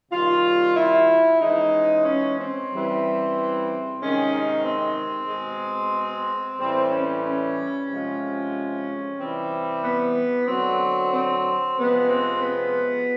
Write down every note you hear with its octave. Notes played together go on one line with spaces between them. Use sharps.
C3 D#3 G3 F4
E4
C#3 E3 G#3 D#4
C#4
C4
C#3 E3 G3
C3 D#3 G#3 C#4
D#4
C4
B2 G#3
A2 E3 G3 C4
C#4
C#4
C3 F3 G#3
C3 E3 G3 C4
B3
D3 F#3 C4
C4
C3 F3 G#3 B3
C4
B3